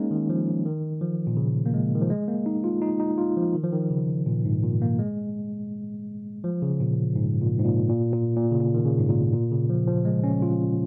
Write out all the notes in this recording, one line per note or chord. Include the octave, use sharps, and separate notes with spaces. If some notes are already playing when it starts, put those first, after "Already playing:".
Already playing: G#3 A#3 C#4 D#4
D#3
F3
D#3
F3
A#2
C#3
A#3
G#3
D#3
F3
G#3
A#3
D#4
F4
D#4
D#4
F4
F3
D#3
F3
D#3
C#3
A#2
G#2
A#2
A#3
G#3
F3
C#3
A#2
G#2
A#2
G#2
A#2
A#2
A#2
A#2
C#3
A#2
D#3
C#3
G#2
A#2
A#2
C#3
F3
F3
G#3
C#4
F4